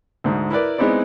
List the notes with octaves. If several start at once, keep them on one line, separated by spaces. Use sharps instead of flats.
D2 G#2
E4 A#4 B4 D5
G#3 B3 C4 D#4 E4 D5